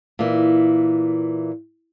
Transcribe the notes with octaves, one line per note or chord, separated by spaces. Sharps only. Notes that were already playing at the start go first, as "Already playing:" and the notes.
A#2 E3